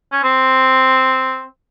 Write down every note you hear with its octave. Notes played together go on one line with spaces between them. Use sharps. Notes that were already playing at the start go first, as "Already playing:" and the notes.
C#4
C4